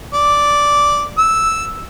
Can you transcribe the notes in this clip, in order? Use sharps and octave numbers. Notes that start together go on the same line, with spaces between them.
D5
E6